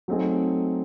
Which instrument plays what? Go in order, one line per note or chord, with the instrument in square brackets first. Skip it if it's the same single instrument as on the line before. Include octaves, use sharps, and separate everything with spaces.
[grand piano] F#3 A3 C4 D#4 G#4